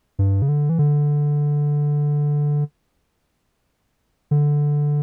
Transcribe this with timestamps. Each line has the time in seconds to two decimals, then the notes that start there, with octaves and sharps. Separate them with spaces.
0.19 G2
0.42 C#3
0.48 D3
0.69 E3
0.79 D3
4.31 D3